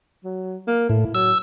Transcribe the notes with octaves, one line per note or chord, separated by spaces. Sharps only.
F#3
A#3
A2 E4
F#3 E6